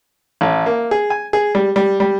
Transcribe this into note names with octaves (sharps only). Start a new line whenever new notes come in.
A1
A#3
G#4
G#5
G#4
G3
G3
G3